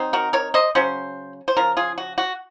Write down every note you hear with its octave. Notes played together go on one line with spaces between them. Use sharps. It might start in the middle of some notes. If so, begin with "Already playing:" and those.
Already playing: F#3 C4 D#4
F#4 A#4
A#4 C#5
C5 D#5
C#3 F#3 C#4 C5
C5
C#3 F3 A#4
F4 G#4
F#4
F#4